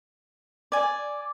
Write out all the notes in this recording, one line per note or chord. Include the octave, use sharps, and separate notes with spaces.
D5 G#5